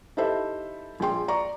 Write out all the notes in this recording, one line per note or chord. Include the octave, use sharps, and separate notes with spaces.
D#4 E4 G4 A4 C5 E5
A#1 G#4 G5 C6
D5 A#5 C#6